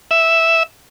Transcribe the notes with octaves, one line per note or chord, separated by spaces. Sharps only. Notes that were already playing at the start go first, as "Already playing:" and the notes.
E5